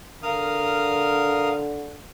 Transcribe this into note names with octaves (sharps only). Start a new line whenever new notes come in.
D3 A#4 F5 D#6